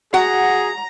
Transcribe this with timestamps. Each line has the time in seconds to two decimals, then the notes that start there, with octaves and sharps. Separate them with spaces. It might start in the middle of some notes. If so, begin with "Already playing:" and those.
0.14 F#4 G#4 F#5 A#5